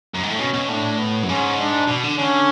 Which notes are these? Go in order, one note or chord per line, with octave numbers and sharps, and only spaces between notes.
F#2
G#2
A2
B2 C#4
B2
A2 D4
B3
F#2
G#2 C#4
D4
B2
D3
D3 C#4